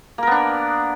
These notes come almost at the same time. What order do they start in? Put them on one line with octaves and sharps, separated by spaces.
A#3 A#4 B3 D4